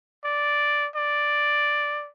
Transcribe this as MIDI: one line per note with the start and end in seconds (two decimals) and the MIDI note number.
0.25 0.88 74
0.96 2.08 74